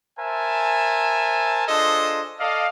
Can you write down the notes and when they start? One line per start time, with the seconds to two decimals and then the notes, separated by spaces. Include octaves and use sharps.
0.18 A#4 C5 E5 G#5 A5
1.68 D4 F4 G#4 A4 C5 D#5
2.40 A4 D5 D#5 F5